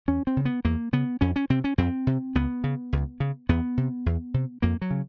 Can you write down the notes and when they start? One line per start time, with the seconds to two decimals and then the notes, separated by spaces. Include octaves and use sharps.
0.08 E2 C#4
0.27 C4
0.37 C#3
0.45 B3
0.65 E2 A#3
0.93 C#3 B3
1.21 F2 C#4
1.36 C#4
1.50 C3 C4
1.64 C#4
1.78 F2 C4
2.07 C3
2.35 C#2 B3
2.64 C#3
2.93 C#2
3.20 C#3
3.49 E2 B3
3.77 C3
4.06 E2
4.34 C3
4.62 F2 A#3
4.82 F#3
4.91 C#3